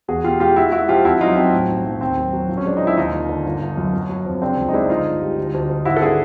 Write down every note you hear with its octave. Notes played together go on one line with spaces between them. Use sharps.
E2 F#4 G#4
B2 F4 G4
G#3 F4 G4
G#3 E4 F#4
G#3 E4 F#4
F3 F4 G4
F2 E4 F#4
F#3 D#4 F4
F#3 C4
A2
B1
B1
D#2 C4
F#3
F#3
A#1
C#4
G#3 D4
F3 D#4
E4
D#2 D#4 F4
D#2
D3
G1
G1
F#2
F#3
F#3
F2
C#3 C4 D4
C#2
D#4
G#3 D4 E4
D3 D#4 F4
G1
G3
D2
D2
D2
G#1 E4 F#4
A4
D3 F#4 G#4